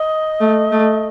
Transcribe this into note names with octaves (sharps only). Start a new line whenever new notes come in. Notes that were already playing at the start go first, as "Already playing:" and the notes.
Already playing: D#5
A3
A3